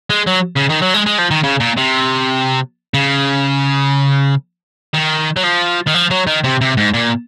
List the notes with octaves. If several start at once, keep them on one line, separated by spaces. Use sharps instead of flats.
G#3
F#3
C#3
D#3
F#3
G#3
G#3
F3
D#3
C#3
A#2
C3
C#3
D#3
F#3
F3
D#3
F3
F#3
D#3
C3
C3
G#2
A#2